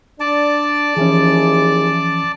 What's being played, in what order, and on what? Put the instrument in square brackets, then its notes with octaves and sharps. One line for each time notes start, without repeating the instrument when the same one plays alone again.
[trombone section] D4 [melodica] D5 A5 D6
[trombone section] D#2 E4 G#4 [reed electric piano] E3 F3 C#4